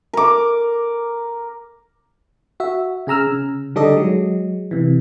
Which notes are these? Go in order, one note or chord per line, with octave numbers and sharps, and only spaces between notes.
A#4 D6
F#4 E5
C#3 G#4 A#5 E6 F6
C#3
D3 G3 D#4 A4 D5 D#5
F#3 G#3
C3 E3